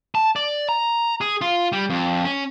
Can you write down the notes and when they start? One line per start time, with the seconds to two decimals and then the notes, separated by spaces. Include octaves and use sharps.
0.15 A5
0.36 D5
0.69 A#5
1.21 G#4
1.41 F4
1.72 G3
1.90 F2
2.25 C#4